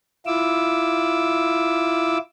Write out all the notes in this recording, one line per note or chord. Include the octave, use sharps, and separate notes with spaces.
E4 F4 D6 E6